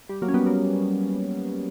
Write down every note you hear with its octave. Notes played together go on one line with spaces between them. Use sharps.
G3
F#3 A#3
C#4
G3 B3
F#3 A#3